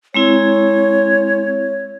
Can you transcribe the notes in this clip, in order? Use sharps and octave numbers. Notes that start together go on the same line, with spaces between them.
G#3 C4 E4 C#5